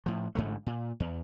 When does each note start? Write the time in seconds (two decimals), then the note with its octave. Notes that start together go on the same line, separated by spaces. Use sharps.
0.06 A2 F3
0.35 A1 G#2 D3 A3
0.66 A#2
1.00 E2